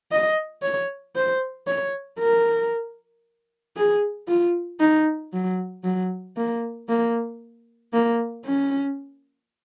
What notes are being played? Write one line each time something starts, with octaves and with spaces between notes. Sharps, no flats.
D#5
C#5
C5
C#5
A#4
G#4
F4
D#4
F#3
F#3
A#3
A#3
A#3
C#4